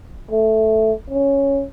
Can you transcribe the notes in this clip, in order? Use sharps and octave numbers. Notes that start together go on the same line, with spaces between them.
A3
C#4